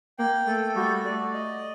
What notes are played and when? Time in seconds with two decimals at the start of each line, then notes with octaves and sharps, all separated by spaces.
0.19 A#3 G5
0.47 A3 A4
0.76 G3 F#4
1.04 A3 D5
1.34 D#5